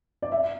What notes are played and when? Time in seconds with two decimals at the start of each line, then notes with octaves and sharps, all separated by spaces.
0.22 D5
0.32 E5